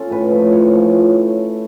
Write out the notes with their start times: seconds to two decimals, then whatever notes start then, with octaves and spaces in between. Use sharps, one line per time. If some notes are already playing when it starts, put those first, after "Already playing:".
Already playing: C#4 F4 A4
0.11 A2 B4
0.31 F3 A3
0.52 A2 C#5
0.73 F3 A3